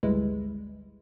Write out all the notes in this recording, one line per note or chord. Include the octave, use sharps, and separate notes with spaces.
G#1 D2 G3 G#3 E4 B4